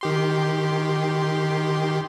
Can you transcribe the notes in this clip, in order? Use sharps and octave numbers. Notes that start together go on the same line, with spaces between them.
D#3 G4 C6